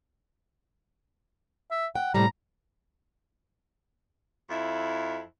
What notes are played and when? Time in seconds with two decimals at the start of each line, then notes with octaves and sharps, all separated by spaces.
1.71 E5
1.95 F#5 G5
2.14 A2 C3 G3 A#5
4.49 F2 E4